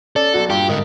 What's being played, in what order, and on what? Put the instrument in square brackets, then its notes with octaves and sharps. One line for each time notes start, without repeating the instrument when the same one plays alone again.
[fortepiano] C#4 [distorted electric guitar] A4 [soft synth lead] D5
[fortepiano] B1 F#4 A5
[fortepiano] G2 A#2 [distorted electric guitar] G4
[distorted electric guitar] G#2 D3 [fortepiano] A#4 [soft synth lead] D#5